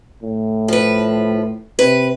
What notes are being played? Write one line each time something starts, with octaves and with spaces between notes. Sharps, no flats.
A2
F3 B4
C3 B4